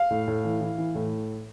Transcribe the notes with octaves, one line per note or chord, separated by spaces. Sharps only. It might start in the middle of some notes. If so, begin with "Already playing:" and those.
Already playing: F5
A2
A2
E3
E3
E3
A2